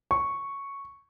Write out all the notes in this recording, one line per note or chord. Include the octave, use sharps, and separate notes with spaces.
C#6